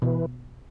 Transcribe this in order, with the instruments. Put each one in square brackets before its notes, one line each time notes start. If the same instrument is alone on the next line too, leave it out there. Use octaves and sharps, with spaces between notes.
[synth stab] B2 [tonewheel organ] E3